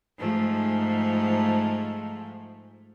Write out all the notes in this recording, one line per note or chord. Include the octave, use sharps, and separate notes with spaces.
G#2 F3 A3